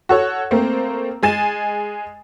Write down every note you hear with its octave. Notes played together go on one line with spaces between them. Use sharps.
F#4 A4 C#5
A3 A#3 C4 C5
G#3 G#5 A6 E7